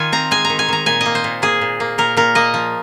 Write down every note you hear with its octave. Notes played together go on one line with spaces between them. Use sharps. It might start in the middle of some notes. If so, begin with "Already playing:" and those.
Already playing: D#3 F4 G#5
C4 A#5
G#3 G#5
D#3 A#5
G#5
D#3 A#5
A#2 G#5
A#3 D#5
C5
A#2
A#3 G#4
A#2
A#3
A#2 A#4
A#2 A#4
A#3 D#5
F3